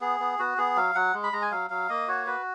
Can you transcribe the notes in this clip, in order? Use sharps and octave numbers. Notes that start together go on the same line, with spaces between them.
B3 G#4
B3
B3 F#4
B3 G#4
F#3 F5
F#3 F#5
G#3
B5
G#3 A#5
G#5
F#3 F5
F#3 F5
A#3 D#5
F#4 C#5
F#4 B4